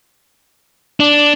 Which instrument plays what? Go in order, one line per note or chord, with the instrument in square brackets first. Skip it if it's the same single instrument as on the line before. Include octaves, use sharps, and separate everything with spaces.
[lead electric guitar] D4